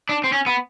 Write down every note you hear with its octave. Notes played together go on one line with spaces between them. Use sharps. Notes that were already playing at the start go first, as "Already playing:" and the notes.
D4
C4
C#4
B3